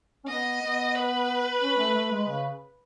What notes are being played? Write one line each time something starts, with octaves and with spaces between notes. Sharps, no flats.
C#4
B3 D#5
B3
B4
C#4
A3
A3
G#3
C#3